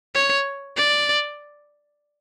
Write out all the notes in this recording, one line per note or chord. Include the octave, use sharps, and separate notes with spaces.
C#5
D5